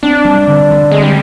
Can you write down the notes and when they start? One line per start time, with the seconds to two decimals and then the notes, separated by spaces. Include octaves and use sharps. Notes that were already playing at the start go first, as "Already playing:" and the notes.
0.03 C4 D4
0.25 G3
0.47 D3
0.70 D3
0.92 G#3 C4
1.02 G3